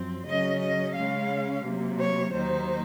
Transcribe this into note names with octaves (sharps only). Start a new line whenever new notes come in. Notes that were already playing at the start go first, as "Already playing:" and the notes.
Already playing: F#2 F3 C4
C#3 F#3 C#4 D#5
D#5
C#3 G#3 C#4 F5
C3 F#3 A#3
C#5
D#2 D#3 F#3 A#3 D#4 C5